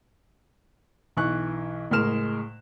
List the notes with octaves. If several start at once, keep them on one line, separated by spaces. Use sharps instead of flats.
B1 E3 C#6 F#6
F#1 A2 G#3 A#4 F6 E7